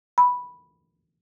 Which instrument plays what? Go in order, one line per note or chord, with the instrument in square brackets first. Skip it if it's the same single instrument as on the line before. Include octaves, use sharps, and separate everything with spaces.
[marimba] B5